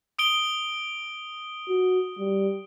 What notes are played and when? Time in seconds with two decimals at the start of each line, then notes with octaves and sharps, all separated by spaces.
0.19 D#6 D7 G7
1.69 F#4
2.19 G3